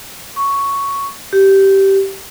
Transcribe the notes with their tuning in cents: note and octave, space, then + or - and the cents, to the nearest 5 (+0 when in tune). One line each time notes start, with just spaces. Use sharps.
C#6 +5
G4 -15